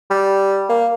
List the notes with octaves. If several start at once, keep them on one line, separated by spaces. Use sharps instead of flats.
G3
A#3